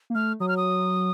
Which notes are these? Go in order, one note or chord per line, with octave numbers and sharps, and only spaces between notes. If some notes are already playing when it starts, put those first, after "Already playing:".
A#3
A3 F6
F#3 D#6
F6
D#6